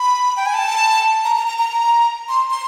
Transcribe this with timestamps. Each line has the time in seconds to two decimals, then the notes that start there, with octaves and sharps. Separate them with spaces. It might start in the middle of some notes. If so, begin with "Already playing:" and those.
Already playing: B5
0.37 G5
0.46 G#5
0.54 A5
1.24 A#5
1.36 A#5
1.48 A#5
1.59 A#5
2.29 C6
2.51 C6